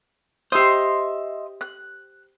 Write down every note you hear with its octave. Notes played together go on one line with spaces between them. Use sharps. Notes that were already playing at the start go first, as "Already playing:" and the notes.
G4 C5 D#5 E5 C6
F#6